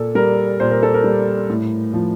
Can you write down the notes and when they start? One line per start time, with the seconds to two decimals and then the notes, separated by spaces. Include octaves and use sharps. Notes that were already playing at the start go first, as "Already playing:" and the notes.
Already playing: A#2 A4
0.15 G3 A#4
0.60 A#2 C5
0.71 A#4
0.83 A4
0.94 A#4
1.04 G3
1.50 A2
1.94 F3